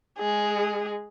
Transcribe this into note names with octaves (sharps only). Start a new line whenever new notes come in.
G#3 G#4